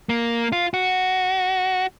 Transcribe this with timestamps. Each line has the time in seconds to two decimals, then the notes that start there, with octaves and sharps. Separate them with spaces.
0.09 A#3
0.52 F4
0.74 F#4